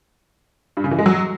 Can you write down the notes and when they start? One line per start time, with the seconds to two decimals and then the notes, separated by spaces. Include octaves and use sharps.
0.77 G2
0.84 C#3
0.91 E3
0.99 G#3
1.06 F#3